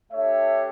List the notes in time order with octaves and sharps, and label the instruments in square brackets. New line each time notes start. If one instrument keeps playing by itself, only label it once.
[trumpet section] A3 D4 G4 C#5 E5